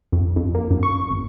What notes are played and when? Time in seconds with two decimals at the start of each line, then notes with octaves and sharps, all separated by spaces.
0.12 F2
0.36 F2
0.55 A#3
0.70 F#2
0.83 C#6
1.10 G#1